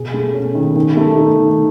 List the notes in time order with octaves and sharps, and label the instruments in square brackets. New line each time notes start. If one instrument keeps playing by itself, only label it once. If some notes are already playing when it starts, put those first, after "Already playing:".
Already playing: [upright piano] B2 G#4
A3
C#4
D#3
D#3
A3
D#4
D#3